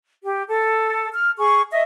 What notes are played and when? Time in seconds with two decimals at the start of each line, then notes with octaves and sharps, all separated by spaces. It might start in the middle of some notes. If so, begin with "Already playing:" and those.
0.23 G4
0.48 A4
1.13 F6
1.37 G#4 C#6
1.71 D#5 E5